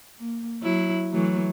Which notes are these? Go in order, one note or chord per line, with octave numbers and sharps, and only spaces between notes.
A#3
F#3 E4
E3 F#3 A3